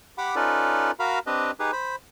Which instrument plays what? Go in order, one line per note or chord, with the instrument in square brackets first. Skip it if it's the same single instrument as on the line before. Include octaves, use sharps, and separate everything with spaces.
[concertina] G4 F#5 B5 D6
C#4 D#4 F4 A4 B4 D5
F#4 A#4 F5 A#5 B5
C4 D4 G4 B4 D#5
D#4 G4 G#4 B4
C5 B5